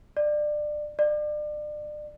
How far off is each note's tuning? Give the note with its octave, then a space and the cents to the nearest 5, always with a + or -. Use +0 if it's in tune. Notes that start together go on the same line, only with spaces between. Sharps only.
D5 +25
D5 +35